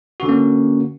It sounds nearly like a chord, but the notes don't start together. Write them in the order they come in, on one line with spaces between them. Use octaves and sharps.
F#4 D3 C#4 A#3